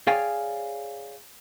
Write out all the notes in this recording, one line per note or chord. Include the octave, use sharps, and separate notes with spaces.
G#4 C#5 D5 F5 G5 G#5